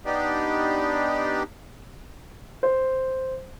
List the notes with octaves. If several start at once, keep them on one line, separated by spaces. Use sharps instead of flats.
B3 D4 D#4 G4
C5